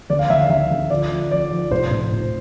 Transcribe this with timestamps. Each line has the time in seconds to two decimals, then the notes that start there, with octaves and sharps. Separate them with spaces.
0.10 D2 D5
0.19 F5
0.30 D2 E5
0.40 F5
0.49 D2 E5
0.71 D2
0.90 F3 D5
1.11 F3
1.31 F3 D5
1.52 F3
1.71 F1 C5
1.91 F1
2.12 F1